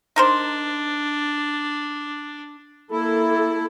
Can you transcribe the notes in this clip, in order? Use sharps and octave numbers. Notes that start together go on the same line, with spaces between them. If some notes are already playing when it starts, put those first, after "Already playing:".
D4 D#4 A#4 C5
A#3 E4 A4